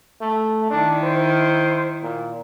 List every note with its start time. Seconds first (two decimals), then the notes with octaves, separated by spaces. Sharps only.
0.21 A3
0.70 D#3 D4 E4
1.04 C5
2.03 A#2